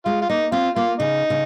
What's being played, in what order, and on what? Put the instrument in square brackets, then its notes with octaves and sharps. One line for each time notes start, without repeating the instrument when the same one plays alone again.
[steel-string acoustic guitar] G#3 [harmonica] F4
[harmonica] F4
[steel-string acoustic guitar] A#3 [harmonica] D#4
[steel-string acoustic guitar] C4 [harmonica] F4
[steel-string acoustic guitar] A#3 [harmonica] F4
[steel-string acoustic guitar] C#3 [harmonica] D#4
[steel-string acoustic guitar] C#3